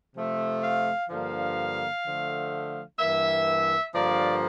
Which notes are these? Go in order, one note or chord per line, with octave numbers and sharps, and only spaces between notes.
C3 F3 A3
F5
G2 D3 F3 A#3 F5
D3 F3 A3
G2 E3 A#3 E5
G2 D3 F3 A#3 D5